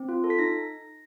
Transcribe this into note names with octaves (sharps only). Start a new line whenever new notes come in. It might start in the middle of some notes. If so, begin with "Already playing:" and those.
Already playing: C4
F4
A4
B6
D#4 A#6